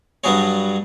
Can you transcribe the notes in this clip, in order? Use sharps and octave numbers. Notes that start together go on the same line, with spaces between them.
G2 F#3 G3 G#4 C#5